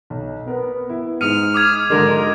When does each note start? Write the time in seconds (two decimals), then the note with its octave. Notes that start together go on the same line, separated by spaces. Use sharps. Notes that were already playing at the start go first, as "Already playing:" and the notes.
0.10 B1
0.48 B3 A#4
0.90 E4
1.21 G#2 D#6 F6 C#7 D#7
1.54 D6 D#6 G#6
1.90 G#2 D3 F#3 G#3 A#4